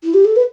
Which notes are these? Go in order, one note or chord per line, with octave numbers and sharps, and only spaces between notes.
E4
G4
A4
B4